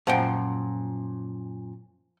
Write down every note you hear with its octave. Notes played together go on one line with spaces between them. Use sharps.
F#2 A#2 F3 F#5 G5